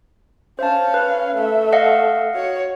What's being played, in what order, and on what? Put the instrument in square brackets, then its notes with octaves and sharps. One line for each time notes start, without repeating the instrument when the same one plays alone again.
[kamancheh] C#4 F5 [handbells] C5 A5
[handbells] B4
[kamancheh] A3 E5
[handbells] D#5 F5 F#5
[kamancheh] F#4 C#5